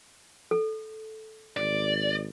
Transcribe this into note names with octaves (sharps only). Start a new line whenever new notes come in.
A4
G#1 D5